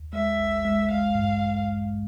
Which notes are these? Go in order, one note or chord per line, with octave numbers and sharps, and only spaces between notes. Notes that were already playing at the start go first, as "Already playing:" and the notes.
Already playing: D#2
G#3 E5
A1
G#3
G#3 F5
G2